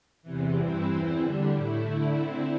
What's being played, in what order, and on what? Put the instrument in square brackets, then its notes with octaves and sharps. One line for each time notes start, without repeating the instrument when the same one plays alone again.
[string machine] E2 C3 E3
G2 E3 C4 E4
E2 E3 C4 E4
D3 G3 D4
A2 A3 E4
D3 A3 E4
D3 C4 E4